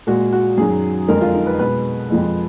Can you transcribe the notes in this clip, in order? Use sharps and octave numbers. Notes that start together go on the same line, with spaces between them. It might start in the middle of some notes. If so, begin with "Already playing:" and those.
A#2 G#3 F#4
F#4
F#2 D#3 F#3 G#4
F2 D3 G#3 A#4
F4
D#4
B4
B2 G#3 B4
F2 F3 G#3